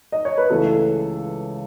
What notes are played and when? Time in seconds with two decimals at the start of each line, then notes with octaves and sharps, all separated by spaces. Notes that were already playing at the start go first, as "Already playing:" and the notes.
0.12 D#5
0.25 C#5
0.37 B4
0.50 C#2 C#3 E3 G#3 A3 A4